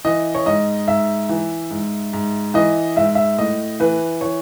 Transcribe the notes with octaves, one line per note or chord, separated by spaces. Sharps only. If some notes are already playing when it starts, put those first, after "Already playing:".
E3 D#5
C#5
G#2 D#5
G#2 E5
E3
G#2
G#2
E3 D#5
G#2 E5
E5
A2 D#5
E3 B4
E3 C#5